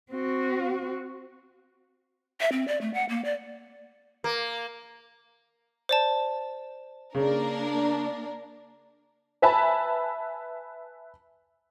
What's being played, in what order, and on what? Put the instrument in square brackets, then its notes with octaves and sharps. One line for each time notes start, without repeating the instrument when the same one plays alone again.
[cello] C4 F#4
[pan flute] E5
C4
D5
A3
F#5
A#3
D5
[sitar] A#3
[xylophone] C5 D5 A5
[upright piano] C#3 [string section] A#3 D4 A#4
[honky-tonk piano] B4 E5 G#5 A5 B5